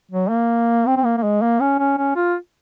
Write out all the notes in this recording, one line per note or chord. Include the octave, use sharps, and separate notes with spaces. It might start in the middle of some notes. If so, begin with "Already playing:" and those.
F#3
A#3
C4
C4
A#3
A#3
G#3
A#3
C#4
C#4
C#4
F4